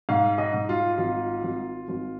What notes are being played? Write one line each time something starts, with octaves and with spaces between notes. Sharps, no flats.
G#2 F5
D#5
G#2
F4
G#1 F4
G#1
G#1